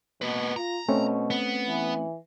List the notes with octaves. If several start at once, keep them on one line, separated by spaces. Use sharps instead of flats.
B2 A#3 B4
F4 A#5
B2 A3 C4 C#4
B3
E3